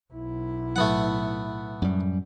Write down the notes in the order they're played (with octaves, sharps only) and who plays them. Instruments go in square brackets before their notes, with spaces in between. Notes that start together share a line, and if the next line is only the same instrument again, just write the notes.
[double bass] B1 E4
[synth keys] A2 F#3 [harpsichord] A3 B3 F#5
[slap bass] F#2 G3